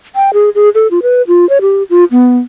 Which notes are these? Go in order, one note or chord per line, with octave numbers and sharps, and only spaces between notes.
G5
G#4
G#4
A4
F4
B4
F4
C#5
G4
F4
B3